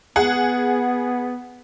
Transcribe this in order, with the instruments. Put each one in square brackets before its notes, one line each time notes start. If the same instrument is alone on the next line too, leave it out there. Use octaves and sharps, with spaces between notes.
[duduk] B3 [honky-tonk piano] G#4 F#5